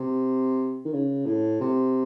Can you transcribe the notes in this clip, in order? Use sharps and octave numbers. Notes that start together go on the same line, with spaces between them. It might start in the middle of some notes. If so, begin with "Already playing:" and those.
Already playing: C3
D#3
C#3
A2
C3